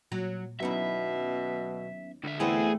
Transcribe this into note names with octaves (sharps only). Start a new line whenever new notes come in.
A#2 F#3
D#2 B2 F#3 B3 C#4 D#4 E4 E5
C#2 D3 E5
E2 A3 C4 E4 G#4